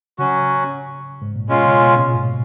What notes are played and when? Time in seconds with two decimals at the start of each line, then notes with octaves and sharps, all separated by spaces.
0.18 C#3 F#3 C#4 F#4
1.22 G#2
1.36 A#2
1.49 B2 G#3 C#4 F4
1.65 C#3
1.82 B2
1.98 A#2
2.14 G#2